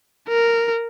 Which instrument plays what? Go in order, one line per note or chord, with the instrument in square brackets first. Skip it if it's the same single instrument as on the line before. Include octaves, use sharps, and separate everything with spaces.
[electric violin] A#4